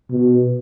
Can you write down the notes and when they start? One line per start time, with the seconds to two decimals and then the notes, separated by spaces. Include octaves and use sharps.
0.11 B2